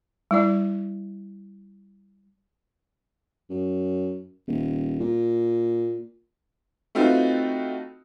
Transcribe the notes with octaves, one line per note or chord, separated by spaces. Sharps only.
G3 E4 D5
F#2
D#1
A#2
A3 C4 D#4 F4 F#4 B4